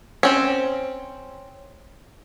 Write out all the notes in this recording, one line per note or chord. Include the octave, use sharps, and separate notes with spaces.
C4 C#4